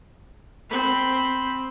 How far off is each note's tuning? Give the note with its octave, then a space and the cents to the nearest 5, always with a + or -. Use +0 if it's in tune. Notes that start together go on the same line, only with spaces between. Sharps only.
C4 +0 B5 +0